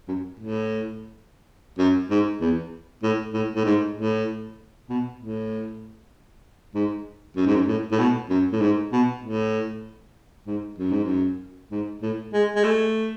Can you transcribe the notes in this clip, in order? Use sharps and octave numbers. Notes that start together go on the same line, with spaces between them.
F#2
A2
F#2
G#2
E2
A2
A2
A2
G#2
A2
B2
A2
G#2
F#2
G#2
F#2
A2
A2
B2
F#2
A2
G#2
B2
A2
G#2
F#2
G#2
F#2
G#2
A2
G#3
G#3
A3